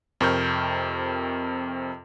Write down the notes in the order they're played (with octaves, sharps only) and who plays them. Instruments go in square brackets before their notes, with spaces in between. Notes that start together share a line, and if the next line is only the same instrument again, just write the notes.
[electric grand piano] F2 C3 A#4 C#6 F6 G6